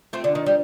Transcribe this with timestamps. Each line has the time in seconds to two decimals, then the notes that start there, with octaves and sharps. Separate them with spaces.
0.13 A3 C4 F4
0.24 D3
0.28 D4
0.35 D#3
0.42 G3 C5